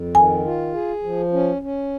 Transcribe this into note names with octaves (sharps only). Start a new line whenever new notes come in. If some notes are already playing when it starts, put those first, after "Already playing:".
Already playing: F2
D#3 G#5
F4
G#4
F3
C#4
C#4